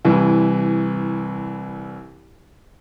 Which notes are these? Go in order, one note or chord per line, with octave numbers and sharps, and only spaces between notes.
C2 E3